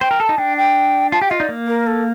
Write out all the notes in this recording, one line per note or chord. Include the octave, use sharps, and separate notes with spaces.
C5 G5
A#4
A4 A5
D#4
D4 G5
G5
F4 A5
G4 G5
F4 D#5
D#4 D5
A#3
A#4
A4